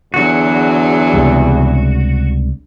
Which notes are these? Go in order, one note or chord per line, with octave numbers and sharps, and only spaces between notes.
E2 D3 F#3 F#4 G#4
C#2 C3 G3